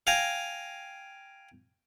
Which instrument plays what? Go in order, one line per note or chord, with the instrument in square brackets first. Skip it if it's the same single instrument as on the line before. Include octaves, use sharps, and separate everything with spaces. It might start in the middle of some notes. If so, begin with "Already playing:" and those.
[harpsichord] F5 G5 G#5 A#5